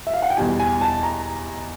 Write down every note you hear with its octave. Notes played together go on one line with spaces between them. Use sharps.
E5
F5
F#5
G5
E2 B2 G3 G#5
G#5
A5
A#5